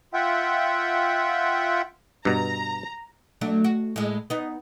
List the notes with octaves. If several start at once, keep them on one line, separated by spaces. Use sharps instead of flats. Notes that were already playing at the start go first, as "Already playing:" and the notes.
F4 E5 F#5 G5
G2 B2 A#5
F#3 A3 D4
F#4
A2 G#3
B3 D#4